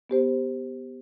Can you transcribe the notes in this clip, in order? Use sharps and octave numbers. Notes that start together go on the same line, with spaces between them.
B3 G4 C5